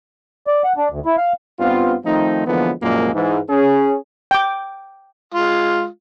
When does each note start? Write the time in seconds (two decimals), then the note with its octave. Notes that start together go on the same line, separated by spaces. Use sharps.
0.47 D5
0.64 F#5
0.77 D4
0.91 D2
1.06 E4
1.17 F5
1.60 G2 B3 C4 F4
2.04 D#3 F3 A3 C4 D#4
2.46 D3 E3 F3 G#3 A#3 B3
2.81 C2 F#2 A#2 F3 G#3 A#3
3.14 G#2 E3
3.49 C#4 G#4
4.31 G5 D6
5.34 G#3 F4